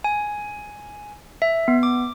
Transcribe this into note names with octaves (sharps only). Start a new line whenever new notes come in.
G#5
E5
B3
D6